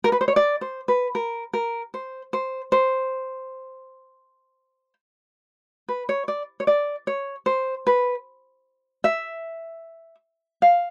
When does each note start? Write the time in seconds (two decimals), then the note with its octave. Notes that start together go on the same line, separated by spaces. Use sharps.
0.04 A#4
0.12 B4
0.21 C5
0.28 C#5
0.36 D5
0.61 C5
0.88 B4
1.15 A#4
1.53 A#4
1.94 C5
2.33 C5
2.72 C5
5.89 B4
6.09 C#5
6.28 D5
6.60 C#5
6.67 D5
7.07 C#5
7.46 C5
7.87 B4
9.04 E5
10.62 F5